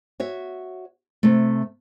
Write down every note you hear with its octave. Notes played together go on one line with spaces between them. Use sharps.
F#4 C#5 E5
C3 A3